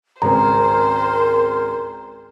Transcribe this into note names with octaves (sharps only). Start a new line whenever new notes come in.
G#1 C#2 C4 A#4 C5 A#5